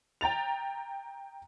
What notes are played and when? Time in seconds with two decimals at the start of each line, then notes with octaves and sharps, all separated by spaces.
0.21 G5 A#5 A6 F7